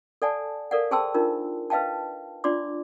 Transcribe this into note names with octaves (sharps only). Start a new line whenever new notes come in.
A4 D5 F#5 G#5 A5
A4 A#4 D5 F5 F#5
G#4 C5 G5 A5 C6 E6
D4 D#4 F4 A#4
B4 D#5 F5 G5 A5
D4 F4 D5 C6 D6